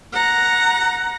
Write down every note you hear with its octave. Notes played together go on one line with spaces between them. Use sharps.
F#5 A#5